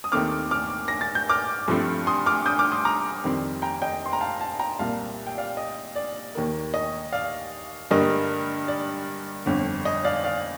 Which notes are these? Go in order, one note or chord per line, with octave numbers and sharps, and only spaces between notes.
D#6
D#2 D#3 A3 C4 D6 F6
D6 F6
A#6
A6
G6
D6 F6
G2 F3 A3 C4
C6 D#6
D6 F6
D#6 G6
D6 F6
C6 D#6
A#5 D6
F2 D#3 G3 C4
G5 A#5
D#5 G5
C6
A#5
F5 A5
F5 A5
G5 A#5
C2 A#2 G3 A#3 F5 A5
G5
D5 F5
D#5
D5
D#2 D#3 A#3
D#5
D5 F5
G2 D3 G3 A#3 D#5
D5
G1 F2 D3
D#5
D5 F5
D5 F5